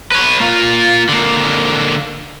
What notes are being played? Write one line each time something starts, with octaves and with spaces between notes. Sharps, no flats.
B4 C#5
A#3 F4
D3 A#3